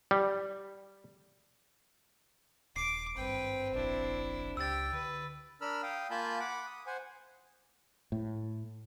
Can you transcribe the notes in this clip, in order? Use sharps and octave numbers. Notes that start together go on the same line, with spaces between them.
G3
D#1 D6 C7 D7
G#1 G2 C4 B4 G5
F1 A#1 D4 E4
C#2 G4 G5 E6 A6
D3 B4
D4 A#4 B5 E6 F6
F5 G5 D#6
A#3 F4 G#5 A5 B5 G6
F#5 B5 D6
D#6
C5 F#5 G#5
A2